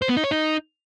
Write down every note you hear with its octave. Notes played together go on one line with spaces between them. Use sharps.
C5
B3
D#4
C#5
D#4